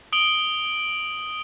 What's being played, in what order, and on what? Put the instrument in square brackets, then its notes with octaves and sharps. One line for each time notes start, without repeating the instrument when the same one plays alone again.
[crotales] D#6 D7 F#7 G7